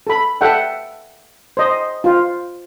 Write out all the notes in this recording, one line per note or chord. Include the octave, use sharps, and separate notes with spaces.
A4 B5
A4 E5 F#5 G5
C5 D#5
F4 C5